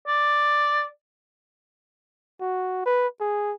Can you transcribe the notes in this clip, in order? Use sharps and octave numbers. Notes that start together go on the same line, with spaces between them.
D5
F#4
B4
G#4